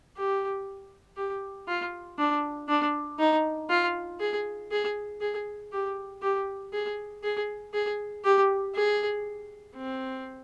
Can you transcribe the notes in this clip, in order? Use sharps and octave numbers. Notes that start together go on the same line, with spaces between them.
G4
G4
F4
D4
D4
D#4
F4
G#4
G#4
G#4
G4
G4
G#4
G#4
G#4
G4
G#4
C4